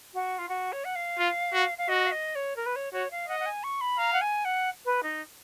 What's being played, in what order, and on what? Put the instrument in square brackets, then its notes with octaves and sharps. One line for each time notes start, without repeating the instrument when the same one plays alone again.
[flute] F#4
F4
F#4
C#5
F#5
F5
[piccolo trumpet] F4
F#4
[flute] F5
[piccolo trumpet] F#4 [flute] D#5
[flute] F5
D#5
C#5
A#4
B4
C#5
[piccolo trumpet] F#4 [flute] C#5
[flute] F5
[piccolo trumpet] D#5 [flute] F#5
[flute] F#5
G#5
C#6
B5
[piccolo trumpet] F5 [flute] A#5
[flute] F#5
G#5
F#5
B4
D#4